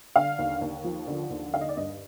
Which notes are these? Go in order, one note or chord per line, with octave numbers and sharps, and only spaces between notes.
D3 F5
D#2
D#2
F3
D3
D#2
D3 F5
D#5
D5
G2 D#5